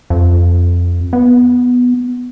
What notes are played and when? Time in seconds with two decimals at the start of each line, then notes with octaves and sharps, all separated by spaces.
0.10 F2
1.13 B3